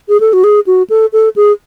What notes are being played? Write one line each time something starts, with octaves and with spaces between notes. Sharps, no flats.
G#4
A4
F#4
G#4
F#4
A4
A4
G#4